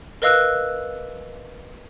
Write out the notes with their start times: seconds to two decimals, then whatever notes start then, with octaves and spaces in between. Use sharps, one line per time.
0.22 A#4 B4 D#5 F5 E6 F#6